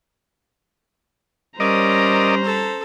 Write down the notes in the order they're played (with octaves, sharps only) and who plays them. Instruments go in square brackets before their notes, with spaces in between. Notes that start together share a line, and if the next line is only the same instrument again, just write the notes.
[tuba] G3 [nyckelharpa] C#4 [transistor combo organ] A#4 D5 D#5 [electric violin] C5 A#5
[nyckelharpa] A4